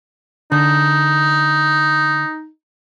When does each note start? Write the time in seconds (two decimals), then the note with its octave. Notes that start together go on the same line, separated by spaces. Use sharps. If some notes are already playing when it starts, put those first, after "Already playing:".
0.52 D3 D#4